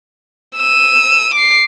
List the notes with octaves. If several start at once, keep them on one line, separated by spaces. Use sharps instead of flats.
E6 D#7
D6 C7